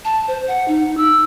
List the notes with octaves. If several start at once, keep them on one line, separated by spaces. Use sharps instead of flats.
A5
C5
F#5
D#4
E6